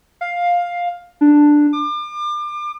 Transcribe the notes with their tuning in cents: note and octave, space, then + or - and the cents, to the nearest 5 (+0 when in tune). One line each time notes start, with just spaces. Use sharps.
F5 +10
D4 +5
D6 +35